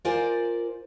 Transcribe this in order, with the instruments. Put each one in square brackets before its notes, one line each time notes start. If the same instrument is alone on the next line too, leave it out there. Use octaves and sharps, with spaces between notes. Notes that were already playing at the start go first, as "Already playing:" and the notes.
[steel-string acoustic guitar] F4 A#4 C5 D5 G#5